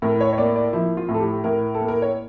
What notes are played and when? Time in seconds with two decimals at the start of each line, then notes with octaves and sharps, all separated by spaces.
0.02 A2 A#4
0.20 C#5
0.33 C#5
0.38 A#3 D5
0.56 D5
0.73 F3 E4
0.97 F4
1.09 A2
1.14 A4
1.20 G4
1.44 A2 A#4
1.75 A4
1.80 A#3
1.88 A#4
2.02 C#5